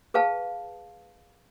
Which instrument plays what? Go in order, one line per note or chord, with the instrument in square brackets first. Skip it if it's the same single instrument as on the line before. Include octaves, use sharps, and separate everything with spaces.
[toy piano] G#4 B4 F5 A5